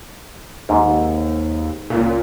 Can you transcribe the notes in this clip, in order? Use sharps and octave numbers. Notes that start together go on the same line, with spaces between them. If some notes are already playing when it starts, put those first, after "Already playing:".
D#2 G#2
C#2 A#2